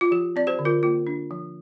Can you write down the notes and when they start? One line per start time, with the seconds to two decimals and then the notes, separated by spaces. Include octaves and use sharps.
0.01 F4
0.11 F3 G4
0.36 C4 D5
0.47 G4 C5
0.59 D3
0.65 F4 A#4
0.83 A#3 F4
1.07 D4
1.31 F3